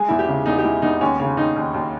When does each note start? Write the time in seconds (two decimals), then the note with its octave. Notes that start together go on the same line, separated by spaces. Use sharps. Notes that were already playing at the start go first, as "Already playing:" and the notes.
Already playing: G#3 G#4
0.09 E2 E4
0.19 G4
0.28 C#3
0.46 E2 D#4
0.58 G4
0.64 G#3 E4
0.82 E2 D#4
1.01 D#2 C#4
1.20 C#3 C#4
1.37 D#2 D#4
1.56 D#2
1.74 D#2